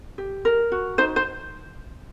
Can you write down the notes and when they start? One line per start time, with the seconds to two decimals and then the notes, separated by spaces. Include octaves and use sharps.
0.18 G4
0.45 A#4
0.72 F#4
0.98 D#4 C5
1.16 C5